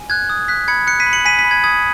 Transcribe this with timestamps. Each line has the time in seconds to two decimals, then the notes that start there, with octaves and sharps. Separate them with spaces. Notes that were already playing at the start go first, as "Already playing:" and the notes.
Already playing: G#5
0.10 F#6 G#6
0.30 D#6
0.48 F#6 B6
0.68 B5 G#6 C#7
0.87 F#6 G#6 C#7
1.00 B6 D#7
1.06 B5
1.13 C#7 F#7
1.25 G#5 B6 D#7
1.39 B6 D#7
1.45 B5
1.51 G#6
1.64 D#6 G#6